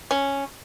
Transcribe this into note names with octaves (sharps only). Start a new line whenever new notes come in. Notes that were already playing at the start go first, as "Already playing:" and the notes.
C#4